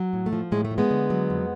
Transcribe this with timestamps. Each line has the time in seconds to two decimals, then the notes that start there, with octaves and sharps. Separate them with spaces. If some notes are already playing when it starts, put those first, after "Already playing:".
Already playing: F#3
0.13 A2
0.26 A3
0.33 F3
0.52 A2 G#3
0.65 A3
0.71 F3
0.78 G#3 B3
0.91 D3
1.10 F#3
1.30 F2